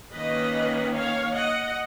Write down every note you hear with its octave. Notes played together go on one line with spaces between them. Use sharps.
D#3 A#3 C#4 B4 D#5
C#5 F5
D#5 F#5